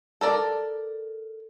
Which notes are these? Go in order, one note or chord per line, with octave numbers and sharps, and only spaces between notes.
A4 A#4 D5